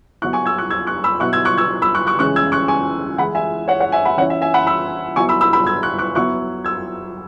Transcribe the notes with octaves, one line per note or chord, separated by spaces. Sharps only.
F#3 B3 E4 C#6 F#6
G#5 C#6
E6 G#6
C#6 F#6
E6 G#6
C#6 F#6
B5 E6
B2 F#3 E4 C#6 F#6
E6 G#6
C#6 F#6
E6 G#6
B5 E6
C#6 F#6
C#6 F#6
C#3 E3 G#3 C#4 C#6 F#6
E6 G#6
C#6 F#6
G#5 C#6
E3 G#3 E4 F#5 B5
E5 G#5
C#5 F#5
C#5 F#5
E5 G#5
F#5 B5
E3 C#4 E4 C#5 F#5
E5
E5 G#5
F#5 B5
B5 E6
F#3 B3 E4 G#5 C#6
B5 E6
B5 E6
B5 E6
E6 G#6
C#6 F#6
C#6 F#6
F#3 B3 E4 C#6 F#6
E6 G#6